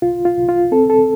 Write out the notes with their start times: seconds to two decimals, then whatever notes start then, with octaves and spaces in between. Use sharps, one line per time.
0.02 C2 F4
0.25 F4
0.37 C2
0.49 F4
0.72 C4 A4
0.90 A4